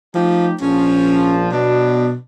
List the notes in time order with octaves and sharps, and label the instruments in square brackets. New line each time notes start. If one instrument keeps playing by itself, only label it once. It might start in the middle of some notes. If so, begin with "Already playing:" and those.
[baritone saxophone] F3 [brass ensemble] A3 D#4 G4
[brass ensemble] A#1 F3 [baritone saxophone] C#4
[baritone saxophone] B2 [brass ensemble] F#3 B3 D4